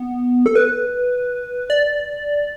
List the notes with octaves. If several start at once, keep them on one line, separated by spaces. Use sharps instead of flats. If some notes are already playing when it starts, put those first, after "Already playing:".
Already playing: B3
A4
B4
D5